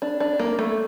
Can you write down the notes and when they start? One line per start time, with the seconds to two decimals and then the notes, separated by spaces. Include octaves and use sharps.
0.02 D4
0.20 D4
0.39 A#3
0.59 A3